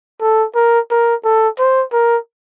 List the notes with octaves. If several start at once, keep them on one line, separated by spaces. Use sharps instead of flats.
A4
A#4
A#4
A4
C5
A#4